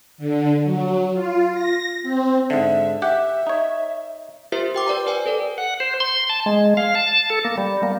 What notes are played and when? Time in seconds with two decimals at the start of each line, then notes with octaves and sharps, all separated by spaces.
0.18 D3
0.64 F#3
1.14 F4
1.53 A#6
2.03 C4
2.50 G#2 D3 E5
3.02 G4 E5 F#5
3.47 D#4 C#5
4.52 F4 G4 A#4 C5 E5
4.74 G4 G5 D6
4.86 B4 D5 G5 A#5
5.06 B4 C5 D5 G5 G#5
5.26 A4 A#4 D5
5.58 F#5
5.80 C5
6.00 C6
6.30 A5
6.46 G#3
6.77 F5
6.95 A5
7.30 A4
7.45 A#3
7.57 G3
7.83 A#3